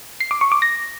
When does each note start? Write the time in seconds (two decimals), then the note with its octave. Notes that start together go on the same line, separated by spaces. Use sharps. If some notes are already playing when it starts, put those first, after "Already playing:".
0.20 C7
0.31 D6
0.41 C#6
0.52 D6
0.62 A#6